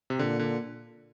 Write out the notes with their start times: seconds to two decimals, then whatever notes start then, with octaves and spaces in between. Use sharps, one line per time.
0.10 C3
0.19 A#2 D3
0.39 D3